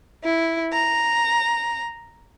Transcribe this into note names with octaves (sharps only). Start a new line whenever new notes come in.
E4
A#5